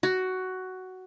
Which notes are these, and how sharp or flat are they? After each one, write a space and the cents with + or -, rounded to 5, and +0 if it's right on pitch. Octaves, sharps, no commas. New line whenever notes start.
F#4 +10